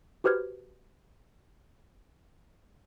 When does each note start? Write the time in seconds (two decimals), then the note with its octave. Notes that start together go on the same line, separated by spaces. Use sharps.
0.24 F#4 G4 B4 C5 F6 G#6